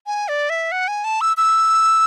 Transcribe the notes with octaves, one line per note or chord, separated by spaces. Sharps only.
G#5
D5
E5
F#5
G#5
A5
E6
E6